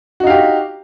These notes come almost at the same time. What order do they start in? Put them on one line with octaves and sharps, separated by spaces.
F#4 D#4 F5 G4